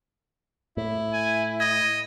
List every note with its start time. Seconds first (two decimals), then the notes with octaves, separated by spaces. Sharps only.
0.77 A2 E4
1.13 G#5
1.60 D#5 G#6